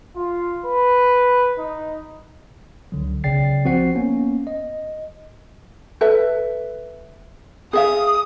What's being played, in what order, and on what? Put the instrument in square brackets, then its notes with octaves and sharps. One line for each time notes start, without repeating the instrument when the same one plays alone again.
[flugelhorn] F4
B4
D#4
[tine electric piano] C#2 D3 F#3
B1 C#3 D5 G5 A6 C7
F3 C4 F#4 C5 F#5 C7
A#3 B3 C#4
D#5
[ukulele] A4 B4 E5
[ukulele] G#4 E5 F5 [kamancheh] D#6